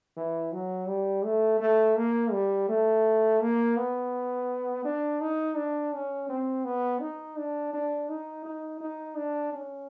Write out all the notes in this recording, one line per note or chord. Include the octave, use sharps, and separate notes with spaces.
E3
F#3
G3
A3
A3
A#3
G3
A3
A#3
B3
D4
D#4
D4
C#4
C4
B3
D#4
D4
D4
D#4
D#4
D#4
D4
C#4